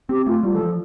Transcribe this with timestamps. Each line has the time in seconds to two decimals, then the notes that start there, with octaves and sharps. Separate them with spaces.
0.09 C4 G4
0.26 A3 F4
0.43 G3
0.52 E3 A4
0.61 F3